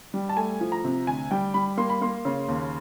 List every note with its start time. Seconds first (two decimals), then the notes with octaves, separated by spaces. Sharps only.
0.14 G3
0.29 A5
0.37 A3 G#5
0.61 F3
0.72 A#5
0.84 C3
1.07 D2 G#5
1.31 G3 G5
1.54 G3 B5
1.77 A#3 C6
1.90 B5
2.02 A#3 C6
2.25 C#3
2.48 D#2